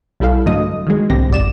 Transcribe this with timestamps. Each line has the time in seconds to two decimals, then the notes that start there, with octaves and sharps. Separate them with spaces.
0.20 B1 G3 E4 A4 F5
0.46 G2 D3 F#3 A3 D#5 D#6
0.87 D#3 F#3 G#3
1.10 C2 G#2 D3 C4 G4 A#6
1.30 G#1 F#2 D5 E7